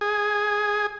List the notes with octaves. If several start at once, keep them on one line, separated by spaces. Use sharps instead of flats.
G#4